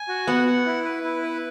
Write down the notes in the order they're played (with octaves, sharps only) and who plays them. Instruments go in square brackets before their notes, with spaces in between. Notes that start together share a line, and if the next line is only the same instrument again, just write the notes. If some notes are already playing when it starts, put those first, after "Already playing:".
Already playing: [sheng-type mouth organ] G#5
F#4
[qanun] B3 [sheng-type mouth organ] F#5
[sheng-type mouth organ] F#5
E4
B4
E4
B4